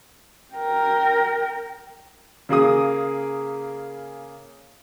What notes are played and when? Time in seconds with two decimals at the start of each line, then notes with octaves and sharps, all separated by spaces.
0.54 A#4 G5
2.49 C#3 A#3 G#4 D#6